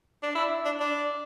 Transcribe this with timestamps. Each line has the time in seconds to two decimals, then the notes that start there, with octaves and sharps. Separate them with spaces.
0.23 D4
0.35 E4
0.65 D4
0.80 D4